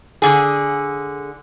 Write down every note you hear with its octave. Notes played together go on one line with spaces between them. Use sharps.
D3 G#4